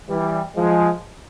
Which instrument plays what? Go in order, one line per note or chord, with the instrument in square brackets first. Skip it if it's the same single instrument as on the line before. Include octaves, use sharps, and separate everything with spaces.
[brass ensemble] E3 G3
F3 G#3